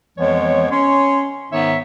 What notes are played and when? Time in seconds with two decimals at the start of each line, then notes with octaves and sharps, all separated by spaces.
0.17 F2 E3 F3 G#3 B3 C#5
0.71 C#4 C#5 C6
1.51 G#2 D#3 B3 D#4 C#5 E5